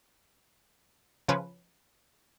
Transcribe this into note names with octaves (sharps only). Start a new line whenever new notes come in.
C#3 F3 C#4 B4